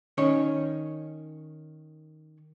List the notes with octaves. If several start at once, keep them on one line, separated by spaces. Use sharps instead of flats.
D#3 C#4 C#5